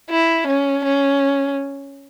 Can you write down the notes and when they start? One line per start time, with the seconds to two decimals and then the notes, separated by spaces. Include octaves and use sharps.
0.10 E4
0.47 C#4
0.84 C#4